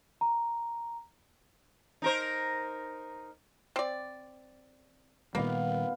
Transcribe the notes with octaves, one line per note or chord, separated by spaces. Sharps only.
A#5
D#4 A#4 C5
C4 D5
A#2 D#3 G3 A#3 B3 F5